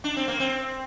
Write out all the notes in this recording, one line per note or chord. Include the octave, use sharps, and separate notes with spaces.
D4
C4
A#3
C4